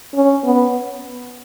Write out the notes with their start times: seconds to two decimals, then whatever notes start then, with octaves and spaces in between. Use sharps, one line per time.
0.15 C#4
0.44 B3